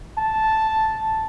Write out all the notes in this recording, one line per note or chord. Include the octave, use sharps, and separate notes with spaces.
A5